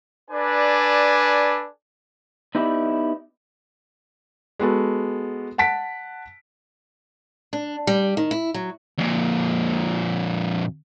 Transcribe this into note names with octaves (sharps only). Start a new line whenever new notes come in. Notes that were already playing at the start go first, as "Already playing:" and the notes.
D4 A4 B4 D5 G#5
B3 D#4 E4 G4 D5
G#3 B3 F#4 A4
F#5 A5 B6 D7
D4
G3
D#3
E4
F#3
F2 A#2